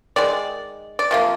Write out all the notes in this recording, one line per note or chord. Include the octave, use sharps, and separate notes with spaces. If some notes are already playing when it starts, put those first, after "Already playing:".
D#3 G#3 D5
D5
C3 F3 A#3